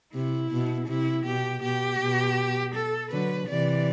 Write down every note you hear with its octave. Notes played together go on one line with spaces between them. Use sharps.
C3 E4
B2
C3 E4
B2 G4
B2 G4
B2
A4
D3 F#3 B4
C3 E3 D5